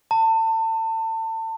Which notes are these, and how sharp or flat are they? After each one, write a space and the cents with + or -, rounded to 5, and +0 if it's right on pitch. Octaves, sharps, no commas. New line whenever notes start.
A5 +30